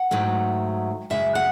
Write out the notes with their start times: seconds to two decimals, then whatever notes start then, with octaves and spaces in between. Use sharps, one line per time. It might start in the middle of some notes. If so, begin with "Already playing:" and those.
Already playing: F#5
0.11 G#2 D#3 F#3 A3
1.10 F#2 C#3 G#3 E5
1.35 F#5